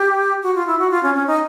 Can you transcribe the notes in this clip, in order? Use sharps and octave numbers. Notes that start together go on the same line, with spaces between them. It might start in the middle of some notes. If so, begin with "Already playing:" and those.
Already playing: G4
F#4
F4
E4
F#4
F4
C#4
C#4
D#4